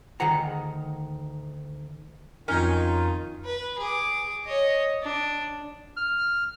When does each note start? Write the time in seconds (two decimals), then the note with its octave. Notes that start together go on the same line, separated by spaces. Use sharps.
0.20 D2 D#3 G#4 F#5 A#5
2.48 F2 D#3 C#4 D#4 F4 A#4 G#5
3.45 B4
3.79 G#4 D6
4.45 C#5 D#5
5.03 D4
5.97 F6